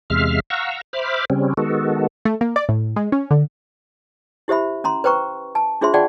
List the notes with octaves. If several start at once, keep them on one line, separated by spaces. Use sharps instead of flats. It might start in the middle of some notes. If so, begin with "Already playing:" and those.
E2 C3 G#3 E5 F5 F6
F5 F#5 A#5 C#6 E6
C5 E5 B5 D6 F6
C#3 G3 C4 C#4
D#3 G#3 B3 F#4 A4
A3
A#3
D5
A2
G#3
C#4
D3
E4 G4 C5 E5 B5
C#4 A#5 C6
B4 C5 G5 A#5 C#6
A5
D4 F4 G#4 C5 E5 C6
F4 G#4 D5 F#5 G5 A5